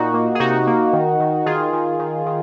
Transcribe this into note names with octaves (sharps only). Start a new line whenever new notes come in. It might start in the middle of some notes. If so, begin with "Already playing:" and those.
Already playing: A#2 D#4 F#4
A#3
G#4
C3 D#4 F#4
A#3
D#3
D#3
D#3 F4 G#4
D#3
D#3
D#3